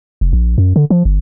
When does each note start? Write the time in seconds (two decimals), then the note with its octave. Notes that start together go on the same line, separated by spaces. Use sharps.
0.21 F1
0.33 A#1
0.58 F#2
0.76 D3
0.90 F3
1.05 G1